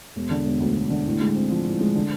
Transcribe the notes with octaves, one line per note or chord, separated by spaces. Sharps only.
E1
D3
E1
D2
E1
D3
A2
G#3
C4
F3
A2
G#3
D3